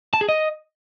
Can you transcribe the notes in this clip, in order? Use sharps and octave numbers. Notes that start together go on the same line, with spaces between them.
A5
G#4
D#5